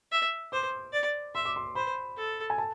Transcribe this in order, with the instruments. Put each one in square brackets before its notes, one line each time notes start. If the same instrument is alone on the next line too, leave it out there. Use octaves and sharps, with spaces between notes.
[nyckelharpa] E5
[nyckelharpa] C5 [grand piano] D6
[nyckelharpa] D5
[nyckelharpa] E5 [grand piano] C6
[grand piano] D6
C6
[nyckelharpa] C5 [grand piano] B5
[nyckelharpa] A4
[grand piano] G#5
A5